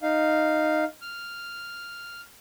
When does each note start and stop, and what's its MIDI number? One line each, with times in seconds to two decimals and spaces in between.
0.02 0.85 63
0.02 0.85 77
1.02 2.21 89